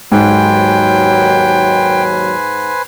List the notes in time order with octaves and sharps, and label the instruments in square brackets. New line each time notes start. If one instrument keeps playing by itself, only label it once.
[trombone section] D#2 F#3 [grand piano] G#2 [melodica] B4 C5 G#5 [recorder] G5